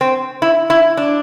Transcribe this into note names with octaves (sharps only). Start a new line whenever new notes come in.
C4
E4
E4
D4